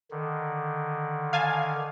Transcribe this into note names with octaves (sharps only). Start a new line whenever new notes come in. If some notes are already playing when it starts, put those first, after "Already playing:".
D3 D#3
F5 G#5 A5